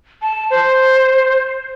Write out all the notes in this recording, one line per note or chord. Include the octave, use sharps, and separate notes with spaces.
A5
C5